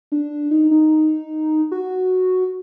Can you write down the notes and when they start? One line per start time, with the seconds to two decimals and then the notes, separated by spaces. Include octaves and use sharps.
0.12 D4
0.51 D#4
0.71 D#4
1.72 F#4